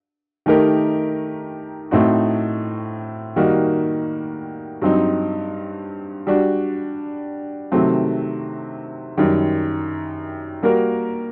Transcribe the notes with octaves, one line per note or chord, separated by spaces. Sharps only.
D#3 A3 D#4 G4 A#4
A2 A3 C4 D#4 F#4
D#3 G3 A#3 D#4 F#4
G2 F#3 C4 D#4
G3 D4 F#4
C3 D#3 F#3 A3 C4
F#2 D#3 G3
G3 A#3 F#4 A#4